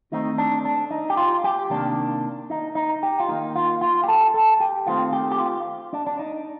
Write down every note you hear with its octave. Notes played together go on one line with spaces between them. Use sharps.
D#3 A3 C4 D#4
D4
D4
D#4
G4
F4
G4
C3 D#3 A#3 D4
D#4
D#4
G4
F4
D#3 A#3 D#4
F4
F4
G4
A4
A4
G4
D#3 A3 C4 F4
G4
G4
F4
D4
D4
D#4